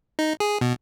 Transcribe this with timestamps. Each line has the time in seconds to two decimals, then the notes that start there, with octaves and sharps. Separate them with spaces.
0.19 D#4
0.40 G#4
0.61 B2